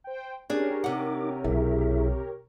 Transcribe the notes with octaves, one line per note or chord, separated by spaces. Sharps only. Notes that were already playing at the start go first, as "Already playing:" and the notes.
C5 G5
C#4 D4 G4 G#4 A#4 C#5
C3 D#4 F#5 D6
B1 E4 G#4 E5